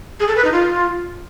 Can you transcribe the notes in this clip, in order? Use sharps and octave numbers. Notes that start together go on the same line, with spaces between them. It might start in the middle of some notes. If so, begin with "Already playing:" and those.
G#4
A4
B4
D#4
F4